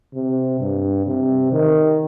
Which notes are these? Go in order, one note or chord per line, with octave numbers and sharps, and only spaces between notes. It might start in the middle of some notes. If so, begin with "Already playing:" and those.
C3
G2
C3
D#3